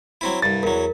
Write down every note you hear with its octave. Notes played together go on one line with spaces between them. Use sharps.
F#3 C4 E4
C2 G2 A6
E2 F#3 A#4